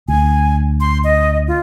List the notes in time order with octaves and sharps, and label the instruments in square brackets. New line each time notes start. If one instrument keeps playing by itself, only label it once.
[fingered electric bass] D2 [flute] G#5
[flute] C6
D#5
F4